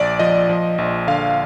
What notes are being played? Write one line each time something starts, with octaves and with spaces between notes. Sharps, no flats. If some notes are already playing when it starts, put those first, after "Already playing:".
Already playing: A#1 D5
F3 D#5
F3
A#1
D3 F5